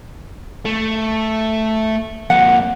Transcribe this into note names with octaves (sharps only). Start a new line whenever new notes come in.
A3
F2 A#3 F#5